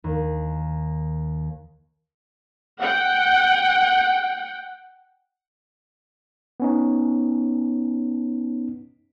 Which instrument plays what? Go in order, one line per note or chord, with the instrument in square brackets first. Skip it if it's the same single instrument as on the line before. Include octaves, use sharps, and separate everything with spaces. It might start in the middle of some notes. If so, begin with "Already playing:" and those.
[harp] D#2
[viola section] F#5 G5
[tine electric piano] B3 C#4 D#4